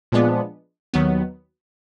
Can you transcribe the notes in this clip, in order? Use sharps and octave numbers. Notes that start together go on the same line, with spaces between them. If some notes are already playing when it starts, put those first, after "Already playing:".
A#2 F3 G#3 B3 D4
D#2 D#3 F#3 B3